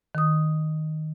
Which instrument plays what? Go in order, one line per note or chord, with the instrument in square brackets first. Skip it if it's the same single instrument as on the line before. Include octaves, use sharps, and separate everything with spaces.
[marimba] D#3 D#6